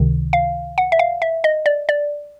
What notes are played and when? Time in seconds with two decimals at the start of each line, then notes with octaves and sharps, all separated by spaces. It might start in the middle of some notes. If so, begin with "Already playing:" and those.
Already playing: C#2 C3 D#3
0.33 F5
0.78 F#5
0.92 E5
0.99 F5
1.22 E5
1.44 D#5
1.66 D5
1.89 D5